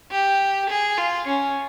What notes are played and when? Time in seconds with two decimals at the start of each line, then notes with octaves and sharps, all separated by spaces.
0.11 G4
0.69 G#4
0.98 F4
1.27 C#4